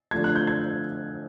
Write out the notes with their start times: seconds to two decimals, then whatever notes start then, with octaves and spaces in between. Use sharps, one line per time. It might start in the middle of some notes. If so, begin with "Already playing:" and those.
0.11 D3 F3 A3 G#6
0.24 F#6
0.35 G6
0.47 G#6